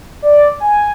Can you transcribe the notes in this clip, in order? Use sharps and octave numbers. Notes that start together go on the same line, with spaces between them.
D5
G#5